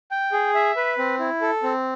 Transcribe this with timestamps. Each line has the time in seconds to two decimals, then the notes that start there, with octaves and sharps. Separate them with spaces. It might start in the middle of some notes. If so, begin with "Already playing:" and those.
0.11 G5
0.32 G#4
0.55 E5
0.76 B4
0.98 C4
1.19 E4
1.42 A4
1.63 C4